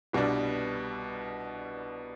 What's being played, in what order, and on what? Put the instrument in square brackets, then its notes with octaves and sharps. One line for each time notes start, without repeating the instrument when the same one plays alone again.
[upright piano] C2 B2 G3 B3 D4